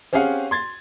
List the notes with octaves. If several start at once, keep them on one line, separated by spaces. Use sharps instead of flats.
C4 C#4 G4 G#4 F5 F#5
C6 G#6 A6